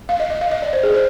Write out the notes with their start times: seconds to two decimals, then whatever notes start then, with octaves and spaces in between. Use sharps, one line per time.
0.09 F5
0.20 D#5
0.30 D#5
0.41 F5
0.51 D#5
0.62 D5
0.73 C5
0.83 G#4
0.94 C5